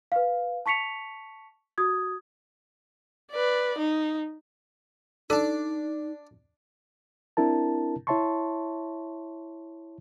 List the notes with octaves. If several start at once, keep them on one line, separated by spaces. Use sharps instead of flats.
B4 F5
A5 C#6 B6 C#7 F7
F#4 D#6 G#6
B4 D5
D#4
D4 D#4 A4 A5
C4 D4 E4 A#4 A5
E4 C#5 E5 A5 C6 C#6